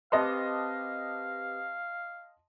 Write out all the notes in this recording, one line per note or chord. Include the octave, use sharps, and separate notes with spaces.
C4 G4 B4 D#5 F5 A5 C6